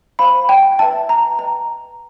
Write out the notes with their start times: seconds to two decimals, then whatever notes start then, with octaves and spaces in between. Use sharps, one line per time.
0.19 C5 F5 B5
0.49 G5
0.79 B4 E5 G5 A5
1.09 A#5
1.39 B4 D#5 G5 A#5